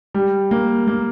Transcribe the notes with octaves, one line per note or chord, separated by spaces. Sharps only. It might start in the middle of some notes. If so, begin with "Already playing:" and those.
G3
A#3
A#3